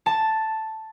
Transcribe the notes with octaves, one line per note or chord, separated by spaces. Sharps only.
A5